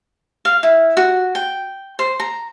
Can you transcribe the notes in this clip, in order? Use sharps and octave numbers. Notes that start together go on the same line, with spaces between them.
F5
E4
F#4
G5
C5
A#5